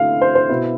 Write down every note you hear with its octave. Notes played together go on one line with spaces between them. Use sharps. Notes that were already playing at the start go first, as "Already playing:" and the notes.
Already playing: D3 A3 E4 F5
C5
C5
B2 B3 E4